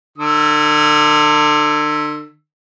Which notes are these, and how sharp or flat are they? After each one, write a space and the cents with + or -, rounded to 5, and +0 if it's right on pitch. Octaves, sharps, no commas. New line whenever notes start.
D3 +40 E6 +0